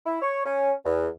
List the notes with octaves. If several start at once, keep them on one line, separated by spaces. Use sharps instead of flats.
E4
C#5
C#4
E2